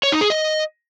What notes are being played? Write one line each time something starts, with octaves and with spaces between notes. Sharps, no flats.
C#5
D#4
G#4
D#5